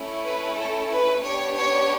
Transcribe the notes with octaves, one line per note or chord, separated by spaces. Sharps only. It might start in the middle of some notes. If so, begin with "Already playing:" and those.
Already playing: A3 C#4 E4
B4
A4
B4
B3 D4 G4 C#5
C#5